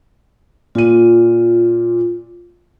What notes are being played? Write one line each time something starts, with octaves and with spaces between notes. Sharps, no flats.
A#2 F4 D#7